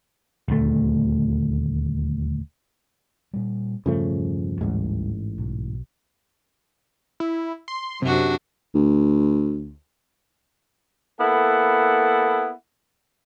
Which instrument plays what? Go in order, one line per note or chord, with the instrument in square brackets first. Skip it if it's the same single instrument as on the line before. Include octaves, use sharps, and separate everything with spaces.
[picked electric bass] D#1 D2 A3
[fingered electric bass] A#2 G3
[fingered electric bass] E1 G2 C#4 [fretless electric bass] C#3 F3 A3
[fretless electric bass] A1 G#2 [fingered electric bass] D2 E3 G3
[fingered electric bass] B1
[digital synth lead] E4
C6
[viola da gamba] F#2 D4 F#4 [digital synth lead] C3
[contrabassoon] D2
[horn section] A#3 B3 E4 A4 F#5